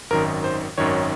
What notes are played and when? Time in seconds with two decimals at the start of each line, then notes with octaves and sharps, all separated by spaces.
0.10 G#1 F#2 D#3 A#4
0.44 C5
0.78 G#1 F#2 D#3 C#5